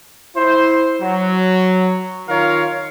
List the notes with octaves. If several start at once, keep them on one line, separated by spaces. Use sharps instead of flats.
E4 C5
F#3
D#3 F4 A#4 C#5 F5